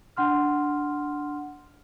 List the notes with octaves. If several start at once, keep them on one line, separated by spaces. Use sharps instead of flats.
D4 F#5 C6 F6